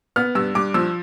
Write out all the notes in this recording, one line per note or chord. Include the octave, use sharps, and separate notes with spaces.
B3 F6
G2 E6
G2 D6
F3 E6